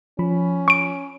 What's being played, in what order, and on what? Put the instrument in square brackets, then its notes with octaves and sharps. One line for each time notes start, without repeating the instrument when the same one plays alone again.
[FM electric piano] F3 B5 [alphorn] C#4
[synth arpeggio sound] C#6 D7